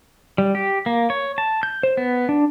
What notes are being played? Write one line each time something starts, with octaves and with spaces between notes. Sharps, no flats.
G3
G4
A#3
C#5
A5
G6
C5
B3
D4